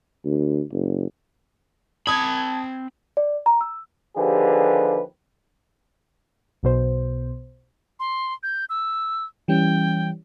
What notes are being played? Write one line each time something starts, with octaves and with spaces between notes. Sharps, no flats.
D2
F#1
C4 A5 B5 D#6 G#6
D5
A#5
E6
D#2 D3 F3 G4 G#4 B4
B1 B2 C5
C6
G6
E6
E3 G3 C#4 G5